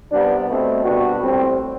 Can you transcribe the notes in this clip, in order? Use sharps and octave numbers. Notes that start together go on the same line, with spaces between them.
C3 G3 B3 D4
B2 A3 C4
B2 G3 B3 D4 F#4
A2 G3 C4